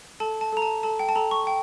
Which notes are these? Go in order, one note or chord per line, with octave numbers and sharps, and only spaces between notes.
A4 A5
A5
A4 A#5
A5
A4 A5
G5
A5
A4 A#5
C#6
G5